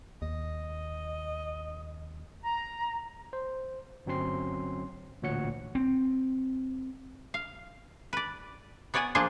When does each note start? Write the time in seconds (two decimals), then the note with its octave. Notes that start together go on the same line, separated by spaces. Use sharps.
0.22 D#2 D#5
2.42 A#5
3.33 C5
4.06 G1 F#3 C4 C#4 C6 C7
5.22 A1 D2 A#2 C#5 F#5 C#7
5.75 C4
7.34 F5
8.13 B4 D5
8.94 B3 C#5 D5 F#5 G#5
9.15 F3 A#3 D4 F4 G#4 C5